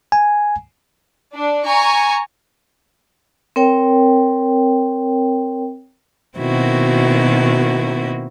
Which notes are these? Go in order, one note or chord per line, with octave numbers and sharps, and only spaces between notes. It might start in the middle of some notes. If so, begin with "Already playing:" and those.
G#5
D4
G#5 A#5 C#6
C4 A#4 C#5 G5
B2 D#3 A#3 C4 E4 F#4